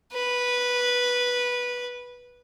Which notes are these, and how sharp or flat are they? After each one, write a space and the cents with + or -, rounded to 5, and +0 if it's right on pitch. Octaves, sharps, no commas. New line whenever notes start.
B4 -10